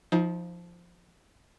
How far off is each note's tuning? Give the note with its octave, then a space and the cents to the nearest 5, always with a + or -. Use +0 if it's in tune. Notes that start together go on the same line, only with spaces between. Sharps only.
F3 +0 D#4 +30